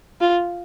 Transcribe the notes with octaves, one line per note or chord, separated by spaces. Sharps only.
F4